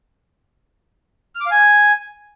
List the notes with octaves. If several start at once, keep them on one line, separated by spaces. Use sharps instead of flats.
F6
D6
F5
G#5